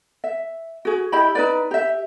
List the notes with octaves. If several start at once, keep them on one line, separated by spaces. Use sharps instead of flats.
E5
F#4 G#4
E4 G4 D#5 B5
D#4 B4 D5
G4 E5